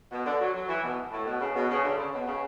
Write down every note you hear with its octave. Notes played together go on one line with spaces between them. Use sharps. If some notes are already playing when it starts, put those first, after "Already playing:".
B2
D3
F#3
F#3
E3
B2
A2
B2
C#3
B2
C#3
D3
C#3
B2
C#3